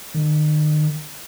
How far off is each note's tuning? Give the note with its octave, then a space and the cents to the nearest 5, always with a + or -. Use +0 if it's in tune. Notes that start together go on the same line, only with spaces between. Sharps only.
D#3 -40